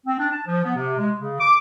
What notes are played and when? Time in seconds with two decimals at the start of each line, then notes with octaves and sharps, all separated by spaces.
0.07 C4
0.19 D4
0.31 A5
0.46 F3
0.64 B3
0.75 C3
0.98 G#3
1.18 C#3
1.40 D6